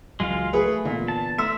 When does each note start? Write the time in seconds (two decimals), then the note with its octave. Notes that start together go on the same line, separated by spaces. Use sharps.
0.20 C#2 E3 F#3 G#3 F4 F5
0.53 A3 G#4 B4
0.85 A#2 D3 E3 B3
1.08 A5
1.38 A3 E5 A#5 C6 E6